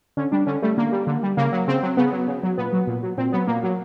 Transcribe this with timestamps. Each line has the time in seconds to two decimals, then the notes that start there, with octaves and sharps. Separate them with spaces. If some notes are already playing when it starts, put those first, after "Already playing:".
0.17 D3 C#4
0.32 G3 D4
0.47 D3 C#4
0.62 G3 A3
0.77 D3 A#3
0.92 G3
1.07 D3
1.23 G3
1.37 C#3 A#3
1.52 F#3
1.68 C#3 C4
1.83 F#3
1.97 C#3 B3
2.13 F#3
2.27 C#3
2.43 F#3
2.58 A#2 B3
2.73 F#3
2.87 A#2
3.03 F#3
3.18 A#2 C4
3.32 F#3 B3
3.47 A#2 A#3
3.63 F#3